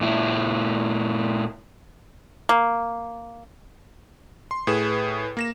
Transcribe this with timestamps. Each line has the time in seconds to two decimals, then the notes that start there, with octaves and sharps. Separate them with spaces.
0.01 A#2 E4
2.49 A#3
4.51 C6
4.67 A2 G#4 B4 E7
5.37 A#3 A#6 E7